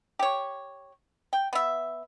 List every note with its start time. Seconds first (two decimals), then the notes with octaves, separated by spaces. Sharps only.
0.19 G4 C#5
1.33 G5
1.53 B3 E5